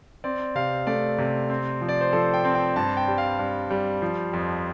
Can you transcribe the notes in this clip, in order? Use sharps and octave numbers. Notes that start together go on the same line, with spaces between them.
C4 D5
C3 F5
A3 D5
C3
C4
F3
D5
C5
F3 A4
G5
C4
G5
G2 A5
G5
G3
F5
G2
G3
F3
F2